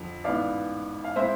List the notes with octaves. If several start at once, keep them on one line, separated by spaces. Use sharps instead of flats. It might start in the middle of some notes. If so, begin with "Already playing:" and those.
Already playing: F2 D3
A1 G#2 E3 B3 D5 F5
F5
A2 G#3 C4 E4 C5 E5